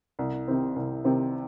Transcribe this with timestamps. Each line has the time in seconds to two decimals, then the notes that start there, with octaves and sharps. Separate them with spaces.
0.19 C2
0.48 C3 D#3 C4
0.76 C2
1.04 C3 D#3 C4